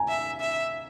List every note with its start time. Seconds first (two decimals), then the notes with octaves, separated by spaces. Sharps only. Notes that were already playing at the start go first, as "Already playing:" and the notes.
Already playing: G#5 A#5
0.08 E5
0.40 E5